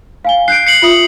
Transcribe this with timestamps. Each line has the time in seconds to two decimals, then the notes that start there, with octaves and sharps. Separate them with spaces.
0.25 F5 G#5 G7
0.48 F#6 G6 C7 D7
0.67 C7 C#7 F#7
0.82 F4 E5 D#6